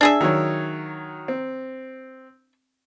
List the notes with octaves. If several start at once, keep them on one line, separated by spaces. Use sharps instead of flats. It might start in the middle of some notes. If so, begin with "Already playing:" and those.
D4 G#4 E5
D#3 F#3 C#5
C4